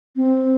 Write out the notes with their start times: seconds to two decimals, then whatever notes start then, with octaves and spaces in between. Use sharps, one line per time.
0.16 C4